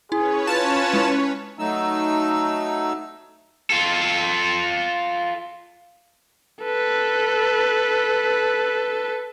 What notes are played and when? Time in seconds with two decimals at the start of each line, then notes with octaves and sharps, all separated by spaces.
0.12 C#4 E4 G#4 B4 C#5
0.47 F4 A5
0.93 G#3 E4
1.59 F#3 A3 D#4 E6
3.70 F4 A4
6.64 A4 B4